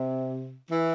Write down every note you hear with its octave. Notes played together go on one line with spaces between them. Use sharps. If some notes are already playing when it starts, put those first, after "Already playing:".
Already playing: C3
E3